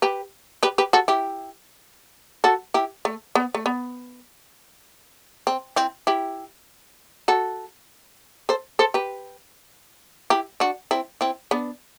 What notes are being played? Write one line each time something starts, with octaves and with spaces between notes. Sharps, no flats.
G4 B4
G4 B4
G4 B4
F#4 A4
E4 G4
F#4 A4
E4 G4
A3
B3
A3
B3
C4
C4 E4
E4 G4
F#4 A4
A4 C5
A4 C5
G4 B4
E4 G4
D4 F#4
C4 E4
C4 E4
B3 D4